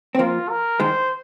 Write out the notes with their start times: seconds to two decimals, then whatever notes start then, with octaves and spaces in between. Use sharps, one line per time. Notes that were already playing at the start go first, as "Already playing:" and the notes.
0.15 C4
0.19 F3 A#3 F4
0.50 A#4
0.80 D#3 G#3 C5